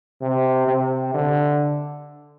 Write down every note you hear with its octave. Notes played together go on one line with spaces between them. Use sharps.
C3
C3
D3